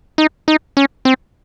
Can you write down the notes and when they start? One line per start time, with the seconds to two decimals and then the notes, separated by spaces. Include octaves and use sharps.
0.18 D#4
0.48 D#4
0.77 C#4
1.05 C4